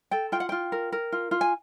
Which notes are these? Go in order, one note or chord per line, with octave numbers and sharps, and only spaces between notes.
A4 G5
F4 G5
F#5
F4 G5
A#4
A#4
F4
F4
G#5